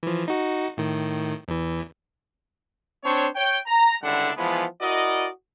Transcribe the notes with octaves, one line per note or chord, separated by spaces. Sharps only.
E3 F3
D#4 F#4
A2 D#3
E2 E3
C4 D4 C5 C#5
C#5 G5
A#5
C#2 D3 G3 D4 E4 F#5
E3 F3 G#3 B3
E4 F#4 A#4 D5 D#5